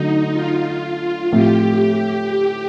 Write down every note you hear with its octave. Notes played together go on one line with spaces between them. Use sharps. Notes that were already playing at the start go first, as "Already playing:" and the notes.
Already playing: D3 F#3 A3 D#4
F4
A2 F3 A3 C4 G4